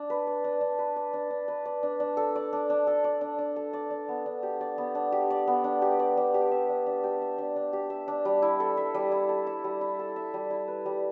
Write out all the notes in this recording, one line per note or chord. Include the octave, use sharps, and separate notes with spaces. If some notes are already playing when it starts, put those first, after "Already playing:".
Already playing: D4
B4
D5
D4
D4
B4
D5
D4
D4
B4
D5
D4
D4
A4
D5
D4
D4
A4
D5
D4
D4
A4
D5
D4
B3
D4
G4
D5
B3
D4
G4
D5
B3
D4
G4
D5
D4
G4
E5
D4
D4
G4
E5
D4
D4
G4
E5
D4
G3
E4
A4
E5
G3
E4
A4
E5
G3
E4
A4
E5
G3
E4
B4
G3